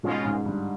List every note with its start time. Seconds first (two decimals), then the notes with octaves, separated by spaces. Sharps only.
0.03 G#2 B2 G#3 C#4 F4
0.24 G#2
0.45 G2